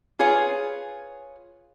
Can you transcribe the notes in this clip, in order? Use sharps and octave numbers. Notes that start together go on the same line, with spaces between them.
F4 G#4 B4 C#5 F5